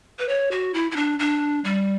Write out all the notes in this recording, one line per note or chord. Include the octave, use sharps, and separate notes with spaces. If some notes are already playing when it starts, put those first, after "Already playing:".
B4
C#5
F#4
E4
E4
D4
D4
G3